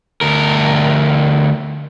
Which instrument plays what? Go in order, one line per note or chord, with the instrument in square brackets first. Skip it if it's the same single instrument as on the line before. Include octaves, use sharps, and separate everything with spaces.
[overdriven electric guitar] D2 A#4